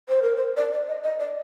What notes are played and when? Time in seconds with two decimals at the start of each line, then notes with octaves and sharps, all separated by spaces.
0.09 C5
0.22 A#4
0.36 C5
0.57 D5
0.72 D5
0.88 D#5
1.04 D#5
1.20 D5